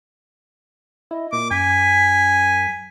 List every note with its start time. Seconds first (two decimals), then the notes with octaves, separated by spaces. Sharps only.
1.11 E4 D#5
1.33 A#2 D6
1.51 F#2 G#5 B6